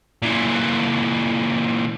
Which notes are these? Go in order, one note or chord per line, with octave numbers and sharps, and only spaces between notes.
A#2 E3